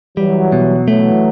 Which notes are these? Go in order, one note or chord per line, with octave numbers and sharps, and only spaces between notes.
E3 F#3 G3
B2
E3 F#3 A3